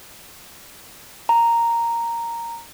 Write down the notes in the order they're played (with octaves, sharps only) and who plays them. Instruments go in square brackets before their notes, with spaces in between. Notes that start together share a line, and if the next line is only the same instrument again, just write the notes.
[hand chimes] A#5